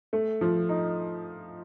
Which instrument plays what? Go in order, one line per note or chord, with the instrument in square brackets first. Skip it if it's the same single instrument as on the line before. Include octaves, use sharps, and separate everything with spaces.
[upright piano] A3
F3
D#4